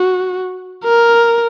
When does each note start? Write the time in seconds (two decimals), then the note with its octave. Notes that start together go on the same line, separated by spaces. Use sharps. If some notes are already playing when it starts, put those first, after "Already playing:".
Already playing: F#4
0.85 A#4